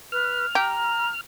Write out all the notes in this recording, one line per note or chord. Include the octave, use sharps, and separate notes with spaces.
B4 F6
G4 A#5